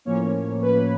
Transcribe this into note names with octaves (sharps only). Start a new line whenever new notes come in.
A2 F3 A#3 C#4 C#5
B4